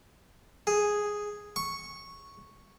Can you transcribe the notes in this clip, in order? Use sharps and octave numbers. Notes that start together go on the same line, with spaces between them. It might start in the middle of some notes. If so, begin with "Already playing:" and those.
G#4
C#6